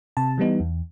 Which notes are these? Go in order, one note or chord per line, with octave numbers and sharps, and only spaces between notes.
C3 A5
E3 G3 B3 D#4
E2